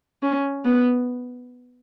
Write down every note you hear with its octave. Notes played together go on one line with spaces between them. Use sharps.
C#4
B3